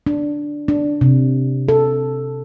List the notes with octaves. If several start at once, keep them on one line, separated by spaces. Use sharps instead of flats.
D4
D4
C3
A4